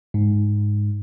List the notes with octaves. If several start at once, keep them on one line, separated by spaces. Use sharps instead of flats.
G#2